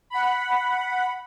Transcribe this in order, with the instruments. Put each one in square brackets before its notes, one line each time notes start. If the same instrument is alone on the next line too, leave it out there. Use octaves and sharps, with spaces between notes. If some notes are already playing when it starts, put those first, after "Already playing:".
[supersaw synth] F#5 B5